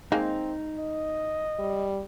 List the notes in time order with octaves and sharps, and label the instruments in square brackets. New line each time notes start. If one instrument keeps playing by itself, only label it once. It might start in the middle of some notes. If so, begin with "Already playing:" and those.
[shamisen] G#3 A#3 [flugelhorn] C4 [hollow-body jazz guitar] D#4
[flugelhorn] D#5
[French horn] G3